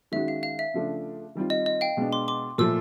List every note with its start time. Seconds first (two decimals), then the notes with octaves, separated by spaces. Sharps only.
0.12 D#3 G#3 C#4 F#4 E5
0.28 F5
0.43 F5
0.59 E5
0.74 C#3 F3 A3 D4
1.35 D#3 G3 C4 F4
1.50 D#5
1.66 D#5
1.81 F5 G5
1.97 B2 G#3 B3 D4
2.13 C6 D6
2.28 C6 D6
2.58 A#2 F3 A3 D6 E6